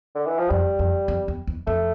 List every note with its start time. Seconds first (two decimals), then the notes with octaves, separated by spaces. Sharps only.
0.15 D3
0.26 E3
0.38 F3
0.50 F2 G3
0.79 F2
1.08 F2
1.28 E2
1.47 E2
1.67 F2 A3